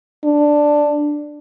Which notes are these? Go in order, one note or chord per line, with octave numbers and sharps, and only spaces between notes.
D4